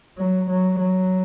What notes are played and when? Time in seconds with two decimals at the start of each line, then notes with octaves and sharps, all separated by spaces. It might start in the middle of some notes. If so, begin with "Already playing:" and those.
0.18 F#3
0.49 F#3
0.78 F#3